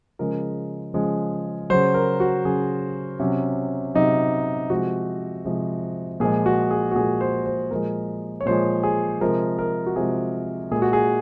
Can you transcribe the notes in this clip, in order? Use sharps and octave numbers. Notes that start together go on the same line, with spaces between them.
C#3 F3 G#3 A#4
C#3 F3 G#3
C#3 F#3 C5
A#4
F#4
C#3 F#3 G#4
C3 F#3 C#4
C3 F#3 D#4
C3 F3 G#3 F#4
C3 F3 G#3
A#2 F3 G#3 G#4
F#4
G#4
F#4
A#2 F3 G#3 G#4
C5
C5
A#2 F3 G#3 A#4
C#5
A#2 F3 G#3 C5
G#4
C3 F3 G#3 A#4
A#4
F#4
C3 F3 G#3 G#4
A#2 G#3 G#4
F#4
G#4